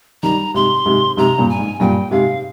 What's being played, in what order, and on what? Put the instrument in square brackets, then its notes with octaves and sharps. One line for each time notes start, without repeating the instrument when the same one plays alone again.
[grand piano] D#3 G3 [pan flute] A#5
[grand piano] G#2 C3 [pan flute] C6
[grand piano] G#2 C3
[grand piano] G#2 C3 [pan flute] A#5
[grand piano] G2 A#2
[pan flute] G#5
[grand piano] G#2
[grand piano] G2 A#2 [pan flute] G5
[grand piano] G#2 C3 [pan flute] F5